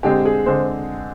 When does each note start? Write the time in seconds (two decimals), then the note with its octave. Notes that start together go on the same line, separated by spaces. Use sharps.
0.03 D3 G#3 C4 G4
0.25 G#4
0.46 D3 G#3 C4 C5